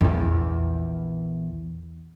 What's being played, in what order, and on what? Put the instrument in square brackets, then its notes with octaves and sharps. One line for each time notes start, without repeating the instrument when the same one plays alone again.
[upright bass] A#1 E2